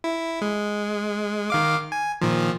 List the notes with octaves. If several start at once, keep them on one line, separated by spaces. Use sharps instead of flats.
E4
G#3
D#3 F5 D6
G#5
A#2 D#3 F3